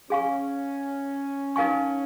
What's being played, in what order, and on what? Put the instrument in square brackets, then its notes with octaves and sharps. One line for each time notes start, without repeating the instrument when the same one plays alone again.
[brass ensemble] C#4 [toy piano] G#4 F5 G#5 C#6
[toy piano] D#4 A#4 F5 G#5 C#6